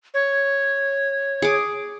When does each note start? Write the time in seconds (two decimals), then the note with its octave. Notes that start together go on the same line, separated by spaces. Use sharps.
0.14 C#5
1.42 G#4 D6